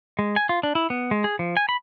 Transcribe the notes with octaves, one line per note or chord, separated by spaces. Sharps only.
G#3
G#5
F4
D4
E4
B3
G#3
G#4
F3
G#5
B5